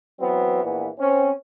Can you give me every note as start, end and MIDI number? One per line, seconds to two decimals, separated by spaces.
0.20 0.60 52
0.20 0.60 54
0.20 0.60 59
0.20 0.60 60
0.64 0.88 34
0.64 0.88 46
0.64 0.88 52
0.64 0.88 59
1.00 1.29 60
1.00 1.29 61